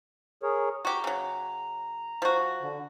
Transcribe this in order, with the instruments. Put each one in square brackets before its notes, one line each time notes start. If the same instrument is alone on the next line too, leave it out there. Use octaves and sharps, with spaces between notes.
[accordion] G#4 A#4 C#5
[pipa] F#4 G4 [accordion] A#5
[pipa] C#3 F#3
F3 F#4
[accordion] D3